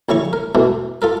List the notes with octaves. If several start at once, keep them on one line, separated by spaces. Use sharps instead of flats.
A#1 C#3 E4 A#5 C#6
A#4
B2 E3 A3
F4 A4 A#4